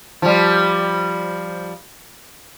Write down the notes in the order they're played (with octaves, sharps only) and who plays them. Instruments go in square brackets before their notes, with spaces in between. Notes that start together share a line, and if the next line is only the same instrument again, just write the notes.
[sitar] F3 G3